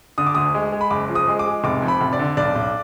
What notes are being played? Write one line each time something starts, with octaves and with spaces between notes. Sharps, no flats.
D3 D#6
D6
D2 D#6
G#3
G#3
B5
F#1 D6
F3
D#6
G#3
D6
G#3
F1 D6
F2
B5
F1
D5
D3
B1 D5
B1